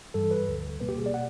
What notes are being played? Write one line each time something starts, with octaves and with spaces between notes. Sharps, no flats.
G2 E3 G3 A4
B4
D2 D3 F3
B2 G3 A#3 B4
G4
G#4
D5
F#5